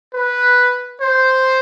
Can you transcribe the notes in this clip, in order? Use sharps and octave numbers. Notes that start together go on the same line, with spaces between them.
B4
C5